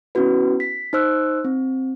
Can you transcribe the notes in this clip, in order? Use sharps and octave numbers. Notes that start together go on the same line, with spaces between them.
B3 C#4 E4 F#4 B4
B6
D#4 C5 E6 F#6
C4